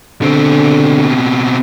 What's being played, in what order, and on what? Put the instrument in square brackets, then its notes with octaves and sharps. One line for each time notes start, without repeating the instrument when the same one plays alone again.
[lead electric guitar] B2 C4 [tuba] D3